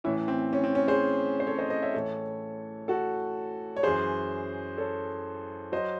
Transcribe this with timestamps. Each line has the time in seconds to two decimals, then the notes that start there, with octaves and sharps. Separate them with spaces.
0.04 A2 E3 C#4 E4
0.28 C4
0.53 C#4
0.64 C4
0.75 C#4
0.88 G#4 C5
1.40 C5
1.47 A4 C#5
1.58 C5 D#5
1.70 C5 D#5
1.82 C#5 E5
1.94 A2 E3 A4 C#5
2.88 F#4 A4
3.76 C#5
3.83 F#2 E3 G#4 C5
4.78 A4 C#5
5.72 F#3 C5 D#5